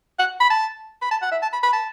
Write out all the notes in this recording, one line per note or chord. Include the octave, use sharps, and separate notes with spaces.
F#5
B5
A5
B5
A5
F#5
E5
A5
B5
B5
A5